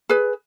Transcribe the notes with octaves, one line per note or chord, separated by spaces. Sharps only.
G#4 B4